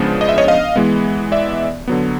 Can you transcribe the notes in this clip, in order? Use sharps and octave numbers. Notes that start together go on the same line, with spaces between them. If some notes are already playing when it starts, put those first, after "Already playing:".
Already playing: C#3 F3 G#3 B3 D4
D#5
E5
C#5 D#5
D#5 F5
E3 G#3 B3
D5 E5
D3 F#3 B3